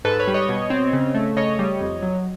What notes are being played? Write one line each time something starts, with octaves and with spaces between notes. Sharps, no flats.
G#2 A4 B4
B4 C#5
G3
C#5 D#5
B2
C4
C#3
A3
C#3 C#5 D#5
G3
F2
F#3